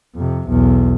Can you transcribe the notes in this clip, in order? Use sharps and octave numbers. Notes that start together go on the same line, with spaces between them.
F2 C3
B1 E2